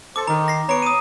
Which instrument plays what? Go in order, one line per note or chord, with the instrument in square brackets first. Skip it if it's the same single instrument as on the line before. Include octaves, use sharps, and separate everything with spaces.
[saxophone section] A4 C5 [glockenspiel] D6
[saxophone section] D#3 [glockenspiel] A#5
[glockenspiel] A#6 C7
[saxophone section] B3 C#5 [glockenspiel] A#5 D7
[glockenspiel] D#6 D#7